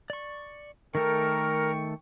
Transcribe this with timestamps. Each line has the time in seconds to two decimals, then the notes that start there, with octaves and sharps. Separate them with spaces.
0.10 D5 C#6
0.95 D#3 A3 A4 A#4 G5 C#6